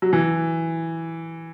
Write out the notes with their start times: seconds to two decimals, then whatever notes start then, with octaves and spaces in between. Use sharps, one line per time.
0.02 F#3
0.13 E3